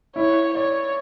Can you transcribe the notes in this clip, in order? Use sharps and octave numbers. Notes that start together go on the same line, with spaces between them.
E4 C#5
C#5 D5